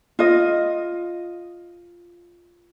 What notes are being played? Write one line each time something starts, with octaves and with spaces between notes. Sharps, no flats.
F4 D#5